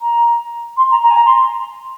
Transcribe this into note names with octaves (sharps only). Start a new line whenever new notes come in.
A#5
C6
A#5
A#5
G#5
A#5
C6